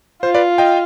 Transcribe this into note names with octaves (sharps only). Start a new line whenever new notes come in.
F4 C5
B4 D5
D#5 G5